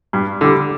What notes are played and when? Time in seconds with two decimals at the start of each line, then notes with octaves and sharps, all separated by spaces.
0.13 G2
0.41 D3 G3